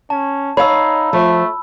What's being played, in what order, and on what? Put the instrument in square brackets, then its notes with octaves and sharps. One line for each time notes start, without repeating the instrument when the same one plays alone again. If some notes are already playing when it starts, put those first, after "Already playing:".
[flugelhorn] C#4 [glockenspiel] A5
[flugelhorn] D#4 [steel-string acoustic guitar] C#5 F5 [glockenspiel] B5 E6
[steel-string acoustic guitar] F3 [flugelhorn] A3